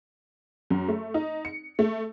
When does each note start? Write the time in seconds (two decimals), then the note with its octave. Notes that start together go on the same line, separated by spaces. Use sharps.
0.70 F#2
0.88 A3
1.14 D#4
1.45 C#7
1.79 A3